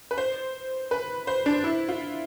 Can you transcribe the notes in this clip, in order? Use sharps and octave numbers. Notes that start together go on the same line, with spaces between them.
B4
C5
B4
C5
D4
E4
F4